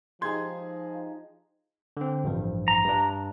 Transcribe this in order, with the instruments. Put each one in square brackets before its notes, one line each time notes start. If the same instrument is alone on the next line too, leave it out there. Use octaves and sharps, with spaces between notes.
[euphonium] F3 [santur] G#3 D#4 G4 [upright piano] G#4 G#6 [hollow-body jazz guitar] C6
[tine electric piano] D3 C4
A1 G2 F3
[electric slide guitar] A#5
[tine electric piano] G2 D4